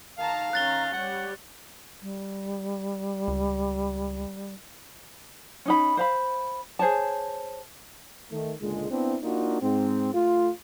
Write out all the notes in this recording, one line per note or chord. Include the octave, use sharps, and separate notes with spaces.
D#3 F5 A5 A#5
D#3 C#4 A#5 F#6 A6 G7
G3 C#5 F#5
G3
C#2
C#4 D#4 B5
C5 F5 B5
G#4 C5 C#5 A5
D#3 A3
C#2 A#2 D3 G#3
B3 C4 D4 E4
A#3 D4 D#4 F4 F#4
G#2 C4
A3 F4